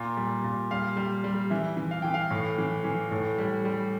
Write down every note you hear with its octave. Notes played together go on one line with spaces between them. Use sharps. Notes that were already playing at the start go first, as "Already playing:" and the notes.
Already playing: A#2
G3
A#2
G3 F5
G3
G3
E3 E5
E3
F5
E3 G5
F5
A2
E3
E3
A2
G3
G3